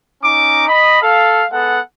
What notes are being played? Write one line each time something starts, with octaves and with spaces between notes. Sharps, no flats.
C#4 D#4 A#5 D6
D#5 B5
A4 F5
G#3 B3 A4 F#5